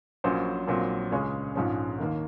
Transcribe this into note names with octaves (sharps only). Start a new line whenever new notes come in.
A#1 A#2 F#3 C#4 C5
A#1 A#2 F#3 C4
C#2 C#3 G#3 C#4 C#5
A#1 G#2 F3 G#3 C#4
D#2 D#3 A#3